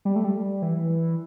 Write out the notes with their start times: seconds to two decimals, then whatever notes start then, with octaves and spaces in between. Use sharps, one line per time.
0.05 G3
0.16 A3
0.24 G3
0.62 E3